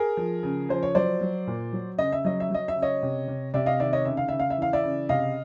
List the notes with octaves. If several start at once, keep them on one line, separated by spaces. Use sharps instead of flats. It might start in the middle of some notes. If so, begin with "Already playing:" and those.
Already playing: G#4 A#4
F3
C#3
F3 C5
C#5
F#3 C5 D5
F#3
A#2
F#3
C#3 D#5
E5
F#3 D#5
E5
F#3 D#5
E5
C#3
C#5 D#5
C3
C3
C3 D5 E5
D#5 F5
D#3 D5 E5
C#5 D#5
C#3 E5
F5
C#3 E5
F5
E5
E3 F5
D5 E5
C#3
C3 D#5 F5